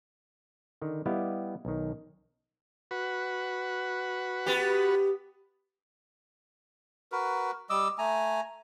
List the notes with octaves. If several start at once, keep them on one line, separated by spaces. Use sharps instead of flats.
D3 D#3
G3 B3 E4 G4 D#5 F5
B1 D#3
F#4 B4
B3 G4
F#4 A#4 B4
G3 D#5 D6 E6
A3 G#5 A#5